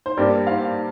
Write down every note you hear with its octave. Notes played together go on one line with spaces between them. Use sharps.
C5
G2 G3 A#3 A#4 D5
C5 F5